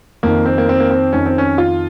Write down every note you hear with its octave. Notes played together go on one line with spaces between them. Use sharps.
F2 D#3 A#3
C4
A#3
C4
A#3
C4
F2 D#3 C#4
C4
C#4
F4